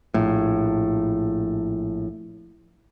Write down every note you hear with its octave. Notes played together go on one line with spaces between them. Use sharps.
A#1 A2